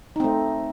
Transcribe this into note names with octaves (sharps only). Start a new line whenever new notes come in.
A3 C4 D#4